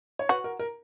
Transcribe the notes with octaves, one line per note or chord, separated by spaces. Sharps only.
C#5
F#4 B4
A#4
A#4